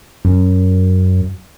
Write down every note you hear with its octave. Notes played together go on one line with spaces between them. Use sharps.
F#2